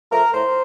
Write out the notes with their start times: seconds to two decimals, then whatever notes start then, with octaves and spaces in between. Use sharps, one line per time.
0.12 F3 A3 A#4
0.33 A2 C5